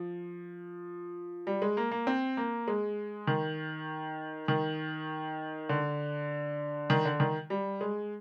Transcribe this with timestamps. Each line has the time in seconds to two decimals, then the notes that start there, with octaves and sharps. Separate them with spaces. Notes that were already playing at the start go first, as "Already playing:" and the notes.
Already playing: F3
1.47 G3
1.62 G#3
1.77 A#3
1.91 A#3
2.07 C4
2.37 A#3
2.68 G#3
3.27 D#3
4.48 D#3
5.69 D3
6.90 D#3
7.05 D3
7.20 D#3
7.50 G3
7.81 G#3